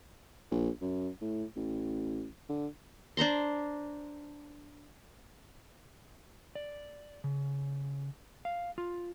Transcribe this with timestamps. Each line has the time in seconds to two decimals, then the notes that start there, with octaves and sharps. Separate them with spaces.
0.51 A#1
0.81 F#2
1.21 A2
1.56 A1
2.49 D3
3.17 D4 C5 A#5 C6
6.55 D5
7.24 C#3
8.45 F5
8.78 F4